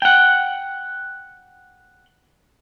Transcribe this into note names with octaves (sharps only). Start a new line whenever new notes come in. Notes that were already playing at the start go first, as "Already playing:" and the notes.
F#5 G5